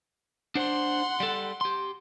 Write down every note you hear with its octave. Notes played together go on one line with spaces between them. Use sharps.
D4 C5 F#5 C6
G3 A4
G4 C6